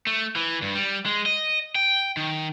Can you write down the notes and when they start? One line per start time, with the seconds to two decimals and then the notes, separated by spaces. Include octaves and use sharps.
0.07 A3
0.36 E3
0.62 G2
0.75 G3
1.06 G#3
1.26 D#5
1.75 G5
2.17 D#3